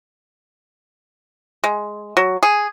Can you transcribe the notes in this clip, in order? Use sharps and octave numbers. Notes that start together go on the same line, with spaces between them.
G#3
F#3
G#4